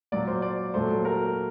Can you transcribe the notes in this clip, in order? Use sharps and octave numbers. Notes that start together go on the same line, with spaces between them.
A#2 F#3 A#3 D5
C5
D5
A#2 F#3 A3 C5
A#4